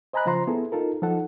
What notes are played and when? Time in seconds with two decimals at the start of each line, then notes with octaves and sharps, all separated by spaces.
0.13 C5 D#5 G#5 A#5 B5 F#6
0.25 C#3 F3 F4 C5 A#5 C6
0.47 B3 E4 G#4 A4
0.72 D#4 F4 A4 A#4
1.02 F3 D#4 A4 F#5